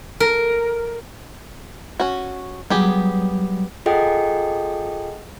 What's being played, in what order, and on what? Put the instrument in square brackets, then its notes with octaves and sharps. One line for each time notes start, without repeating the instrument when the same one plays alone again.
[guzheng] A#4
[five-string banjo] C#4 F#4
[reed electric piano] F#3 G3 [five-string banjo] B3 G4 G#4
[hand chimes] F4 G#4 A4 D#5 F#5 G5